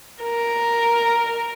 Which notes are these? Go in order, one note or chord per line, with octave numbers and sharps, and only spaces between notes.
A#4